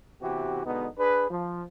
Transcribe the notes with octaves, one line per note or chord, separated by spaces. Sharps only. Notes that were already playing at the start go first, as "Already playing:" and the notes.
C3 E3 B3 F#4 G4
B2 D3 G#3 B3 D#4
D4 G#4 B4
F3